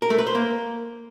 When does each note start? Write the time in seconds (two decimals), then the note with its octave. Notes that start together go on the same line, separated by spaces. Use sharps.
0.02 A#4
0.10 A3
0.18 B4
0.27 C5
0.35 A#3